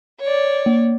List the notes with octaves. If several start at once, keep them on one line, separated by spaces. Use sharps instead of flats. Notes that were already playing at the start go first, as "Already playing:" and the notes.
C#5 D5
A#3